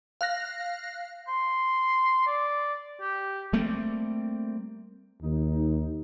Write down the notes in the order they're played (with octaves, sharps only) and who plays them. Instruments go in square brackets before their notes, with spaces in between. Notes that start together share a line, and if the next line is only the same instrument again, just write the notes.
[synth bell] F5 F#6 A#6
[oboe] C6
D5
G4
[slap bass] G3 A3 A#3 C4
[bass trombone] D#2 [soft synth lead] D#4